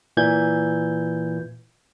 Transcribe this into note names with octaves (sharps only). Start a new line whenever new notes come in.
A#2 E3 G6 G#6